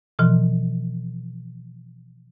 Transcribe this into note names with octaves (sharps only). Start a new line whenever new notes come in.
B2 E3 F3